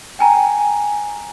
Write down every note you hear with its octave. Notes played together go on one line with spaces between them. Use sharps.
G5 G#5 A#5